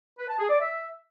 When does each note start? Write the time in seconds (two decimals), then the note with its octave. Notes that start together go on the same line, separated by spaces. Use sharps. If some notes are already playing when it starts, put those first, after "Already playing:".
0.19 B4
0.29 A5
0.40 G#4
0.50 D5
0.60 E5